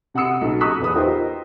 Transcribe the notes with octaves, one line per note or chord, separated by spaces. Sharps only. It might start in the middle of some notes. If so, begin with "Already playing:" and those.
C3 F#5 D#6 E6 C#7
B1 C#3
A#5 C#6 D#6 E6 F#6 B6
E2 B4 D#6
D#4 F4 G4 A#4 C5 D#5